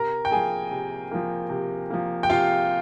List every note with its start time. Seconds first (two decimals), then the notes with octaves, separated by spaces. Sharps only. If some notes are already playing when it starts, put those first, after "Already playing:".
Already playing: C3 A#4 A#5
0.25 G5
0.31 F3 A#3 G#4 G#5
0.71 C3
1.11 F3 A#3
1.50 C3
1.90 F3 A#3
2.23 G5
2.30 C3 F4 F5